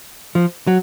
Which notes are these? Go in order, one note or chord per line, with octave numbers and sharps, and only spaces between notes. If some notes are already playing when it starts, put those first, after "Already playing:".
F3
F#3